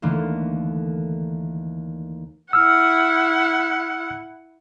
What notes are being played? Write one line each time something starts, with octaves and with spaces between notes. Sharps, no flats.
D#2 D3 E3 A3 A#3
E4 F#5 E6 F6